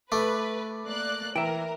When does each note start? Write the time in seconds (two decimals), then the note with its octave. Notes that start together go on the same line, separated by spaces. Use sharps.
0.12 A3 B4 D6
0.85 A#3 D5 F#6
1.36 E3 A#4 E5 G5